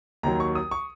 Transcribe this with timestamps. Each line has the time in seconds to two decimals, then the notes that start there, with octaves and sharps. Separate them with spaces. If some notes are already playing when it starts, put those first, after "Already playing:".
0.23 D#2 D#3 F#3 A#5
0.40 C#6
0.55 D#6
0.71 C#6